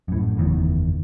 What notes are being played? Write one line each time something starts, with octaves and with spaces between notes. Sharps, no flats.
F#2 A2
F#1 E2 D#3